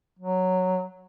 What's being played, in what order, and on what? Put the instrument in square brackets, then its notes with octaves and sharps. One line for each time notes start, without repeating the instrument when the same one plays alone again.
[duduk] F#3